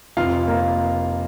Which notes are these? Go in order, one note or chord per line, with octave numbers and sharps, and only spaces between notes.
F1 F4 F5
A#3